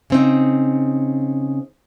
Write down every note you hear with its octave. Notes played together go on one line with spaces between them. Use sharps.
C#3 C4 D#4